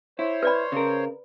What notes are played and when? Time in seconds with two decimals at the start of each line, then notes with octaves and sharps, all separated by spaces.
0.19 E4 C5 C#5
0.43 B4 D5 B5
0.72 C#3 A#4